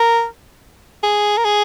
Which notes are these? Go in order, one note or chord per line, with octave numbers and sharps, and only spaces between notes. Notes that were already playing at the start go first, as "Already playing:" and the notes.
Already playing: A#4
G#4
A#4
G#4